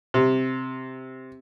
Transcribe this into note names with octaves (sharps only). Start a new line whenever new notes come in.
C3